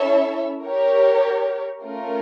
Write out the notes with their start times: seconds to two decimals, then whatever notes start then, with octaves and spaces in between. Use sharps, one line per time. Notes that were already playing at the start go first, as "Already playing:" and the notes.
Already playing: C#4 E4 A4 C#5 E5
0.64 G4 A#4 C#5
1.82 A3 C#4 F4 A#4